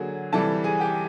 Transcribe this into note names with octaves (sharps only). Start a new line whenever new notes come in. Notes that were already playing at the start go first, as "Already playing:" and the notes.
Already playing: D3 F#3 A#3 G#4
C3 E3 G3 A4 A5
G#4 G#5
G4 G5